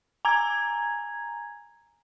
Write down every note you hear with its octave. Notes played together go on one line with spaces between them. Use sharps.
G#5 A#5 G#6